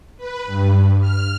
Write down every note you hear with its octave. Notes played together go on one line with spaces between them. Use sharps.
B4
G2
F6